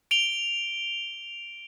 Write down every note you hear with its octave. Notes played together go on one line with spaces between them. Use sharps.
D7 F7 G7